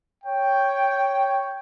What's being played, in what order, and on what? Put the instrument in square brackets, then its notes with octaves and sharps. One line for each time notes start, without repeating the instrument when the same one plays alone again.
[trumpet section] C#5 G5